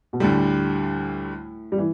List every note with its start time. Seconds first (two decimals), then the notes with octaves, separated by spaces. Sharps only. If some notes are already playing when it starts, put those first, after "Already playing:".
0.13 B2
0.20 D2 A2 D3 G3
1.72 G3
1.78 E3